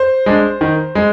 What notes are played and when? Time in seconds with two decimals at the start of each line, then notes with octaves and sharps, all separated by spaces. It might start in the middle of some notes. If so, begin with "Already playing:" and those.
Already playing: C5
0.26 G#3 D4
0.61 D#3
0.95 G#3